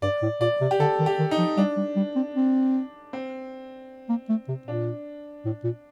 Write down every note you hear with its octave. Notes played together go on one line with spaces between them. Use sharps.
G2 D5
A2
A#2 D5
C3
G4
D3 A4
D#3
G4
D#3
D#4
F3
G3 D4
G3
G3
C4
C4
C4
A#3
A3
C3
A#2 D4
A2
A#2